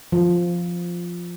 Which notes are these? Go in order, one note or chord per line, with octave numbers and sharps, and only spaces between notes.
F3